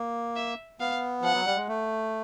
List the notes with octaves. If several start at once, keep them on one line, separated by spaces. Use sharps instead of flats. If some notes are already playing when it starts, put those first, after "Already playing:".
Already playing: A#3
E5
B3 F5
F3 F#5
F#3
G3
G#3
A3